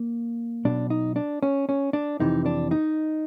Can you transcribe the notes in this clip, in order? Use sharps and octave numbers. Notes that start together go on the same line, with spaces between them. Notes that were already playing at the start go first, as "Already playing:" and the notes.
Already playing: A#3
B1 B2 D4
D#4
D4
C#4
C#4
D4
F2 C3 E3 D#4
D4
D#4